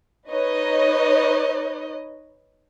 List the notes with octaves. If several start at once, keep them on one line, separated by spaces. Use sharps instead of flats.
D#4 B4 C#5 D#5